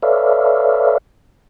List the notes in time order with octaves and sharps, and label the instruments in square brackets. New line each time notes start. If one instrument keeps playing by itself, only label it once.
[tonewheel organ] A4 B4 C#5 D5 E5 F5